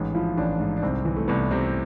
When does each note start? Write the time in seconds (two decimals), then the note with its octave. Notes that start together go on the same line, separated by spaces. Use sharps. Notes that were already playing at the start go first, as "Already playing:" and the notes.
Already playing: A1 G#2
0.15 F3 E4
0.38 A1 D4
0.60 G#2
0.77 D4
0.82 C2 C4
1.05 E3
1.16 A3
1.28 C2 B3
1.51 C3 C4